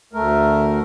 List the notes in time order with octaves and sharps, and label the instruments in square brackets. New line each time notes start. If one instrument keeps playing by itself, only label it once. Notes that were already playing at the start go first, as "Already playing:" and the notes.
[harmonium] D2 A3 A#4